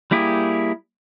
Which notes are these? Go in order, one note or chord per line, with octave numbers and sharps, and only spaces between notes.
G3 A#3 E4 G4 G#4